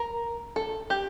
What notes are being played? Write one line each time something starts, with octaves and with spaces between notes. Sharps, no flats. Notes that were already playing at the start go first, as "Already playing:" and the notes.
Already playing: A#4
A4
G4